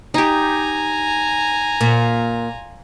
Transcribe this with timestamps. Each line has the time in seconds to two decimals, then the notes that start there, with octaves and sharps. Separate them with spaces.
0.14 D#4 G4 G#5 A#5
1.81 A#2